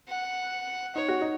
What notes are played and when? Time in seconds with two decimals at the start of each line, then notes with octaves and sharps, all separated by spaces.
0.08 F#5
0.95 D#4 C#5
1.08 F#4
1.21 D#4